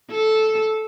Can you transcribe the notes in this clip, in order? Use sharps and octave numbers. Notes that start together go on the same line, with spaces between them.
A4